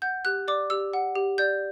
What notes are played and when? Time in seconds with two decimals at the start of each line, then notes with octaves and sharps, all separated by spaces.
0.02 F#5 G6
0.25 G4 F#6
0.48 D5 D6
0.70 G4 E6
0.93 F#5
1.15 G4
1.38 D5 G6